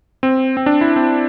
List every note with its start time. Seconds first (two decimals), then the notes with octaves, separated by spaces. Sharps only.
0.23 C4
0.57 C4
0.66 D4
0.81 E4
0.96 C4